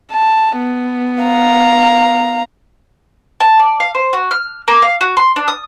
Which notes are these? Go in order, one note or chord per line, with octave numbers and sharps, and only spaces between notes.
A5
B3
F5 A#5
A5
D5
F5
C5
F#4
F6
A#3
F5
F#4
C6
D4
D#6